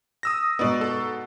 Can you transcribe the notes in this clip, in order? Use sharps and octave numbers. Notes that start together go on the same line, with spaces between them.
D#6 E6 A#6
G#2 B2 B3 D#4 D5
A4